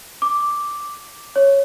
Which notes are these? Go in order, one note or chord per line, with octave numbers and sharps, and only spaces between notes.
D6
C#5